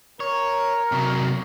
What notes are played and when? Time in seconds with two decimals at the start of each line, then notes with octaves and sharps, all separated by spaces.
0.20 A#4 C#5
0.92 C3 F#3